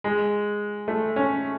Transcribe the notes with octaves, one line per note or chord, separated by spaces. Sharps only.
G#3
A3
C#4